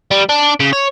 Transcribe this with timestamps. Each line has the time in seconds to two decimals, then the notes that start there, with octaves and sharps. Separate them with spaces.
0.11 G3
0.29 D4
0.60 C#3
0.73 C#5